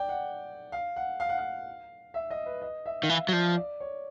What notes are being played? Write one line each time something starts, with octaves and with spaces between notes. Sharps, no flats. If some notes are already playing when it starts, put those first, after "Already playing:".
Already playing: D5 G5
F#5
F5
F#5
F5
F#5
F5
E5
D#5
B4
D#5
E5
D#3 F5
E3 E5
F#3
F3 D5
D5
C#5